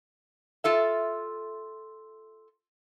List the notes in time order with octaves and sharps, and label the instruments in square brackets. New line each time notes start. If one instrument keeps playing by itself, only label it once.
[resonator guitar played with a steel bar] F4 A4 E5